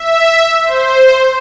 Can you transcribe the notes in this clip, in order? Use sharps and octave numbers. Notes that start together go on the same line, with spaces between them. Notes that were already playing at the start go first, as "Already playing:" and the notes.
Already playing: E5
C5